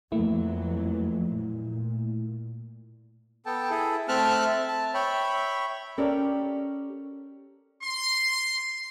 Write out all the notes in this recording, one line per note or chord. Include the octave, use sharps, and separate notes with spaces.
F2 E3 F#3 A3 A#3 E4
A#2
B3 A4 G5 A5
E4 G#4 A4
A3 C4 E5 A5 F6 F#6
A5
C#5 E5 G5 B5
C#4 G4 A4 A#4 D5
C6